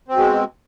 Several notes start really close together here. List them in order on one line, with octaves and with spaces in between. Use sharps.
C4 B2 G#3